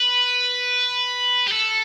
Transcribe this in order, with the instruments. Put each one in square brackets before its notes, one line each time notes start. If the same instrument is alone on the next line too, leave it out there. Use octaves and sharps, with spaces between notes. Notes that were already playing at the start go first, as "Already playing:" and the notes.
Already playing: [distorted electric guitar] B4
G4
A4